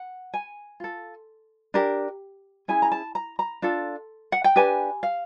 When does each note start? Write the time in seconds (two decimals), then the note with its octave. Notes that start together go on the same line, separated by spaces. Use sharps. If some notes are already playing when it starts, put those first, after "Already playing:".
Already playing: F#5
0.34 G#5
0.80 F4 A4
1.74 D4 G4 A#4
2.68 C#4 E4 G#4 G#5
2.82 A#5
2.92 A5
3.15 A#5
3.39 A#5
3.62 D4 F4 A4
4.32 F#5
4.44 G5
4.56 D4 G4 B4 G#5
5.03 F5